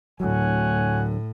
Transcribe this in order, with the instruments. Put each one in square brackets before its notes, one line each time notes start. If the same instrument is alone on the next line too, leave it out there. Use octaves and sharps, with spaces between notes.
[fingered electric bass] D2 F#3 [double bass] A2 [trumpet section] C#5 F#5 G#5